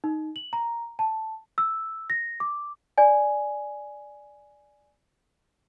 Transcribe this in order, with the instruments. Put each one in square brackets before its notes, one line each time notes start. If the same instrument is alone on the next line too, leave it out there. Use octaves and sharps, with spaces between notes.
[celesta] D#4
F#7
A#5
A5
E6
A#6
D6
D5 G#5